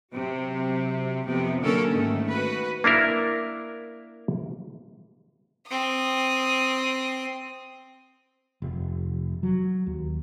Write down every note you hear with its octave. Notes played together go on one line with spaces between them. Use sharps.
C3 F#3
F2 C3 B3
D3 F#3 A#3 C#4 A4 A#4
G#2 D#3 A3
F#4 B4
A#3 D4 E4 A#4
C4 D#6
F1
F#3
D#2